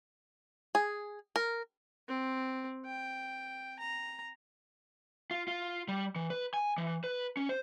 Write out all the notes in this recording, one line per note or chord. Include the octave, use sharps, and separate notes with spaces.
G#4
A#4
C4
G5
A#5
F4
F4
G3
E3
B4
G#5
E3
B4
C#4
C5